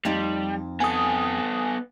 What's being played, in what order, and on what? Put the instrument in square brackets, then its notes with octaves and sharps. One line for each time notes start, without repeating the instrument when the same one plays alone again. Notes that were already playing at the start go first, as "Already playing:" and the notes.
[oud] F2 C4 D#4 [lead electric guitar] G3
[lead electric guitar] B3 A4 [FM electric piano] G#5 D#6